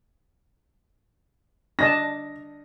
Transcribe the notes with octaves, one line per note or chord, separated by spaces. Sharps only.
D4 D#5 A5 A#6